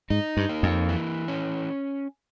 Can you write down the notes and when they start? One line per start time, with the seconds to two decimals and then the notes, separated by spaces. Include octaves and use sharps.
0.10 G#2 D#4
0.37 G2
0.49 A#3
0.63 F2
0.89 E3
1.28 C#4